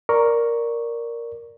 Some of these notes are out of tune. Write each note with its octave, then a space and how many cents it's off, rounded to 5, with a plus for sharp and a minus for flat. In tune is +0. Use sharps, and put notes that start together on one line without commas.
A#4 +0 D5 +0 C#6 +0